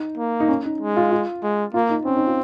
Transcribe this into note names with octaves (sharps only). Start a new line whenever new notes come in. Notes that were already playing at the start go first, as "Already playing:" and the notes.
Already playing: D#4
A#3
D#4
C#4
D#4
G#3
F4
F4
G#3
A#3 F4
D#4
C4 C#4
D#4
F4